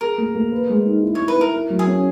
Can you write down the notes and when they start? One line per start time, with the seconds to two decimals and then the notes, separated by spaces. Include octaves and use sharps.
0.01 G#4 A#4
0.18 A#3
0.35 A#3
0.52 B4
0.69 G#3
0.85 D#4
1.03 E4
1.15 E4 C#5
1.28 B4
1.36 E4 A#4
1.54 A#4
1.70 F#3
1.79 G#4
1.87 C#4